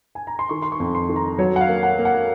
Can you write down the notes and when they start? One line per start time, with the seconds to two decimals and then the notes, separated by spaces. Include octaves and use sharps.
0.15 G#5
0.27 A#5
0.39 C6
0.49 D#3 C#6
0.62 C6
0.72 C#6
0.80 F2
0.95 C6
1.09 D#3
1.16 A#5
1.38 F#3 C#5
1.56 F#5
1.61 F5
1.69 A#3
1.83 F#5
1.98 A#3
2.05 F#5